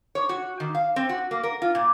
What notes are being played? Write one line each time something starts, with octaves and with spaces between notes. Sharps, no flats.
C#5
F#4
D#3
F5
C4
F#4
A#3
A#4
F4
A#2